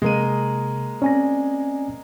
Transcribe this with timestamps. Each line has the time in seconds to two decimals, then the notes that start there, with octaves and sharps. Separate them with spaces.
0.02 C3 G#3 A#3 D#7
1.02 C4 C#4 D5 G#5 A#6